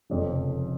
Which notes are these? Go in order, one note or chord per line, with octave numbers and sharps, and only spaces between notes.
F1 F2 C#3